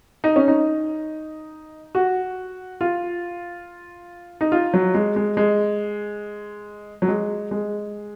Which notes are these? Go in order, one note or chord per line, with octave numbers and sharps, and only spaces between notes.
D#4
C#4
D#4
F#4
F4
D#4
F4
F#3
G#3
G#3
G#3
F#3
G#3
G#3